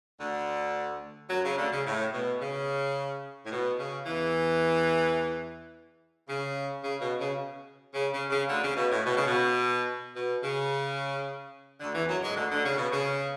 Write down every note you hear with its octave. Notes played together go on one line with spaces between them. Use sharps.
D2 D3
F#2 F#3
C#3
D2 D3
C#3
A2
B2
C#3
A2
B2
C#3
E2 E3
C#3
C#3
B2
C#3
C#3
C#3
C#3
D2 D3
C#3
B2
A2
B2
C#3
B2
B2
C#3
D2 D3
E2 E3
F#2 F#3
G#2 G#3
D2 D3
D2 D3
C#3
B2
C#3